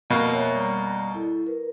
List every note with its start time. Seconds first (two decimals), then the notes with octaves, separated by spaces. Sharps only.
0.10 F2 B2 A#3
0.33 C#5 E5 G5
0.53 G3 D5 A#5
1.14 E4 A4
1.47 A#4 B4